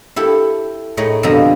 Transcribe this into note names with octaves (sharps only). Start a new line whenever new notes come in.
E4 G4 A4
A2 A3 D#4 G#4 C#5 D#5
F2 B2 D3 G3 C4 A#5